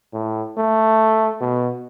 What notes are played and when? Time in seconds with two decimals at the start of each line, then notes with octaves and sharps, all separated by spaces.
0.13 A2
0.58 A3
1.41 B2